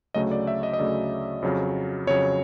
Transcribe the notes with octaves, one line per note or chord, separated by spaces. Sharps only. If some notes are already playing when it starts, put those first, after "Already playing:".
D2 C#3 F#3 A3 D#5
D5
E5
D#5
D#5
D2 C#3 F#3 A3 D5
F2 C#3 F#3
F2 C#3 F#3 C#5